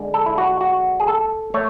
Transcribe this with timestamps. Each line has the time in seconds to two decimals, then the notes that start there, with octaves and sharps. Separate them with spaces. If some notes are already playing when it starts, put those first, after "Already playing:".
Already playing: D3 G#3
0.14 A4
0.26 E4
0.38 F#4
0.61 F#4
1.00 G#4
1.08 A4
1.54 A3 C#5